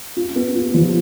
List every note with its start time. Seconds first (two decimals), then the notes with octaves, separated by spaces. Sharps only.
0.17 F4
0.36 B3
0.55 F4
0.74 F3